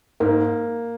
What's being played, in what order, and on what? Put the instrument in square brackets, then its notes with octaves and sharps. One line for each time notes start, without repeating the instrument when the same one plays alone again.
[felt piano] G#2 A#3